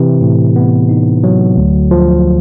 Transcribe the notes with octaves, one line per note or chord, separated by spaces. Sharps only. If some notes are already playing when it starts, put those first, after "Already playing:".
Already playing: C3 E3
A2
B3
D#4
F#3
D2
F3